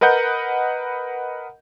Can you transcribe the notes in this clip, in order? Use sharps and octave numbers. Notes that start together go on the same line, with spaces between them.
A#4 B4 D#5 F#5 G6